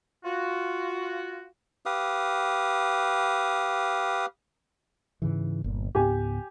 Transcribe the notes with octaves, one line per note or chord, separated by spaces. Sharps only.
F4 F#4
G4 B4 F5 D#6
G#2 C#3 E3
G1 A#2
C#2 G#2 B3 G4 G#5